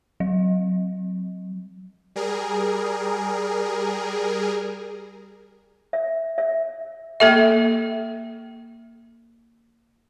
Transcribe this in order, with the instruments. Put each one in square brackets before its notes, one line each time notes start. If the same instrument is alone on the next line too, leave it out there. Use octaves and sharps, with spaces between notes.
[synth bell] F#3
[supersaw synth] G3 G#4 A#4
[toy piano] E5
E5
[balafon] A#3 A4 E5